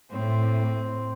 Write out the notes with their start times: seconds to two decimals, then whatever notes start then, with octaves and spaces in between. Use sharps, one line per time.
0.11 A2 C4